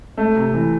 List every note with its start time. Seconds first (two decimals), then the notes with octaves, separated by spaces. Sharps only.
0.17 A3
0.36 C3
0.54 E3